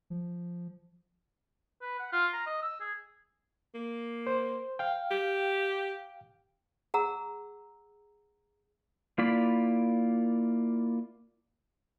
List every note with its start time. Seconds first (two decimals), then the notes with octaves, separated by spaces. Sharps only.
0.10 F3
1.82 B4
2.00 F#5
2.13 F4
2.33 A#5
2.46 D#5
2.62 E6
2.81 G#4
3.75 A#3
4.27 C5
4.79 F5 G5
5.11 G4
6.94 G#4 F#5 A#5 E6
9.18 A#3 E4 F4 D5 B5